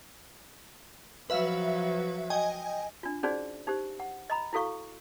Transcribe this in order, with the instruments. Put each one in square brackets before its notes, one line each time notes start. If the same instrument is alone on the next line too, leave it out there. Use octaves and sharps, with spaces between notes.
[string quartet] F3 F#3 [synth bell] B4 E5 F5
[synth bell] D#5 G5 G#5
[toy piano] D4 F4
C#4 D#4 F#4 G#4 C5 D5
D#4 G4 C5
F#5
D#5 A#5 B5
E4 F#4 A4 F5 C#6